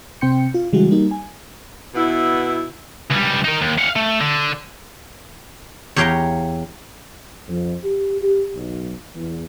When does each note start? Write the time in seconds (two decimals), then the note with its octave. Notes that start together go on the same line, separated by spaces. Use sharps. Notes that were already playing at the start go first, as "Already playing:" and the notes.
0.21 C3 C4 G5 C6 G6 C#7
0.54 F4
0.73 C#3 E3 G3 G#3 F#4
0.91 G3 A#3 D#4
1.11 G#5
1.95 B2 B3 E4
3.11 C#2 G3
3.45 D#4 A#4
3.62 D#2
3.78 F5 F#5
3.96 A3
4.21 D3
5.96 E2 G4 C#5 F5 G5 A#5
7.48 F2
7.83 G4
8.22 G4
8.54 B1
9.15 E2